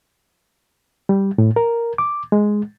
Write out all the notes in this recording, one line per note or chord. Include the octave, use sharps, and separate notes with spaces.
G3
A2
A#4
D6
G#3